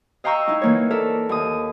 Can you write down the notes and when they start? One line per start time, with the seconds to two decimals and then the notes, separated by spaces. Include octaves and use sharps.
0.24 D#5 F5 G5 A#5 C#6 E6
0.47 D#4 E4
0.62 E3 A#3 C#5
0.90 A4 A#4 D5 E5
1.29 D#2 D#6